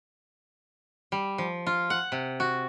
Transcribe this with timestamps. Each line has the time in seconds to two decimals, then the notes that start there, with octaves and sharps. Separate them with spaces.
1.12 G3
1.38 F3
1.67 F4
1.90 F#5
2.12 C3
2.40 F#4